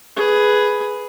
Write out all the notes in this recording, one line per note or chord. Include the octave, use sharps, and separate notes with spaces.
G#4 B4